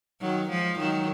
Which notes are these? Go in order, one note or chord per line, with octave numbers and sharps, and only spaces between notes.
D#3 F#3
F3 G#3
D#3 F#3